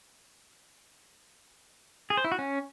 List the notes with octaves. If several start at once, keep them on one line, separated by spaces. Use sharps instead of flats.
G#4
C5
E4
F#4
C#4